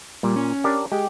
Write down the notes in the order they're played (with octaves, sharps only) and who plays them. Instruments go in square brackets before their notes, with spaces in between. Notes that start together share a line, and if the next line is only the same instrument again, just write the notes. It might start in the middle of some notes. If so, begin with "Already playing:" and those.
[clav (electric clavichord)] A#2 [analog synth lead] G3
[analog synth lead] C#4
[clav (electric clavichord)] D4 G4 A#4
[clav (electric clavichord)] G#3 [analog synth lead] G4